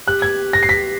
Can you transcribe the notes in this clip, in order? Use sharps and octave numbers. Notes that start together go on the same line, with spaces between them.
G4 F#6
G#6
A#6
C7
B6